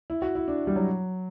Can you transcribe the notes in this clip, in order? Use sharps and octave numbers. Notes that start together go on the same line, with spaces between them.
E4
F#4
E4
D4
G3
F#3